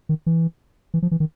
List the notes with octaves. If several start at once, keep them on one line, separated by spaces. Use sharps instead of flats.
D#3
E3
E3
F3
E3
D#3